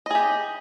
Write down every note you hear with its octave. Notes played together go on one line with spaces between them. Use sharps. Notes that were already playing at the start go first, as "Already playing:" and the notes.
G4 G#4 D#5